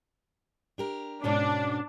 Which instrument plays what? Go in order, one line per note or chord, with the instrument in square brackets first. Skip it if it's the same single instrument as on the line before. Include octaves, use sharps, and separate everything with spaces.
[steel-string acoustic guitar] D4 G4 A#4
[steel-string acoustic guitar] G#2 B2 C#4 [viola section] D4